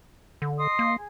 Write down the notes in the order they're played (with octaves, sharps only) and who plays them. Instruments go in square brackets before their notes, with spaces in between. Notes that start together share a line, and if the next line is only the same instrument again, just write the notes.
[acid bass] D3
[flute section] D#5 C6 D#6
[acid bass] A#3
[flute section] G#4